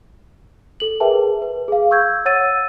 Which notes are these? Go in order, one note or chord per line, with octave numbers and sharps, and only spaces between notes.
A4 F#7
G#4 A#4 B4 E5 G5 A5
B4
G#4 F5
C#6 E6 G6 G#6
C#5 F#5 E6 A6 D#7